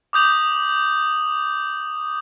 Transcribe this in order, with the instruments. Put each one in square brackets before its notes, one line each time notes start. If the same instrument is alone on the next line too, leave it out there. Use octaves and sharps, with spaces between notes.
[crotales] D6 D#6 G6 F7 F#7